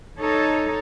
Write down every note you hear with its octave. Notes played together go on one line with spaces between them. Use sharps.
D#4 A4 C#5